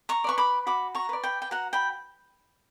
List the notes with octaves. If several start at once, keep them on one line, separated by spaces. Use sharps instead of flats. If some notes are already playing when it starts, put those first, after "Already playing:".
A#5 C#6
B4 D5 C#6
B5 D6
F#4 B5 D6
A#5 C#6
B4 D5
G5 B5
G5
F#4 F#5 A#5
G5 B5